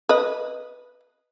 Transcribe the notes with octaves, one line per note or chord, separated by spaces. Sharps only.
B4 D#5